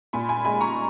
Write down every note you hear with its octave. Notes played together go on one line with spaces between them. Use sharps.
A#2 G#5 B5
G#5 B5
G#3 G#5 B5
A#5 C#6